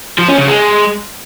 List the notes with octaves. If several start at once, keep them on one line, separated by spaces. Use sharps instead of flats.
F3
C#4
C#3
G#3